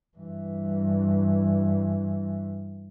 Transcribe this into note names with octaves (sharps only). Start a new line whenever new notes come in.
G2 E3